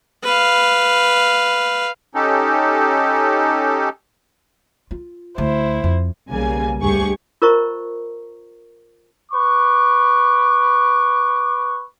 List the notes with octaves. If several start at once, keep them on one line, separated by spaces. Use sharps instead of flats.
B4 F5
C#4 D#4 G4 A4
F4
D2 E4 C5
F2
B1 C#3 G3 A#3 G#4 G#5
D2 G2 G4 G#4 C#6
F4 A#4 C5 D#5 A#5 C#6
B4 C#6 D6